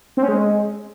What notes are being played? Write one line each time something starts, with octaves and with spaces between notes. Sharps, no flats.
C4
C#4
G#3